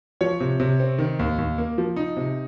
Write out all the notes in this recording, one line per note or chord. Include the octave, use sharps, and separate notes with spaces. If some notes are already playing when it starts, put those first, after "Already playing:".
F3 C#5
C3
C3
C4
D#3
D#2
D#2
A#3
F3
D#4
C3